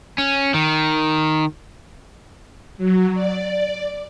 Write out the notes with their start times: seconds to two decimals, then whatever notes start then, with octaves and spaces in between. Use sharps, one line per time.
0.18 C#4
0.54 D#3
2.78 F#3
3.14 D5